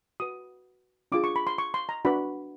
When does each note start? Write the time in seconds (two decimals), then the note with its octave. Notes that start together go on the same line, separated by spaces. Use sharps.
0.20 F#4 B4 D#6
1.12 D4 F4 G#4 D6
1.24 C#6
1.36 B5
1.47 C6
1.58 C#6
1.74 C6
1.89 A#5
2.05 D4 F#4 B4 B5